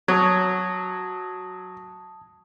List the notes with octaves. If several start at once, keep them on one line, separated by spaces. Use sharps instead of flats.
F#3 C#5 A5 D#6 G#6